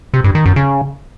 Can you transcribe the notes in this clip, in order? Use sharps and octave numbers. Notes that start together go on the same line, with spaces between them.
C3
G2
D#3
F#2
C#3